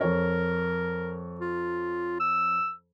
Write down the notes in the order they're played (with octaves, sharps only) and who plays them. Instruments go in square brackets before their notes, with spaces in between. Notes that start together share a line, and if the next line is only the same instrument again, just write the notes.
[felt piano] F2 C#5 [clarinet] A#4
[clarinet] F4
E6